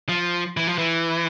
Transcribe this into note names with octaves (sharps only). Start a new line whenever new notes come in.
F3
E3
F3
E3